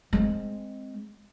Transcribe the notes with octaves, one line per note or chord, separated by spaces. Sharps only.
G#3 C4